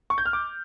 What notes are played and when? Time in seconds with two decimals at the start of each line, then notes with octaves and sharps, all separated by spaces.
0.10 C#6
0.18 G6
0.26 F6
0.33 D6